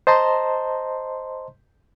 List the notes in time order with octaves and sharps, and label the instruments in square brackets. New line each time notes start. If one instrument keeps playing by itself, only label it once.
[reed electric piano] C5 D#5 A5 A#5 C6